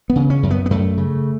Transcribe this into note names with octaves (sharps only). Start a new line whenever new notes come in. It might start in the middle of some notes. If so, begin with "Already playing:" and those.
B3
C#3
C#4
F#2
B3
B3
F#2 A3
C#3